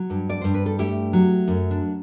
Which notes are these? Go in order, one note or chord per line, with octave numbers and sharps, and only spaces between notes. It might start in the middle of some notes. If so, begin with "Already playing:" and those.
Already playing: F#3
G2
D5
G2 C5
B4
A4
A3 E4 G4
F#3
F#2
D4